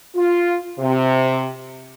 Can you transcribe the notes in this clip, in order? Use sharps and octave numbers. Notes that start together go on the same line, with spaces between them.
F4
C3